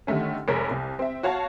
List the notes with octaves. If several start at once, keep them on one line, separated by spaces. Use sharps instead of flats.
D3 D#3 G3 A3 C#4
F1 G#3 A#4 C#5 B6
C2
C4 E5
F#4 C#5 F5 A5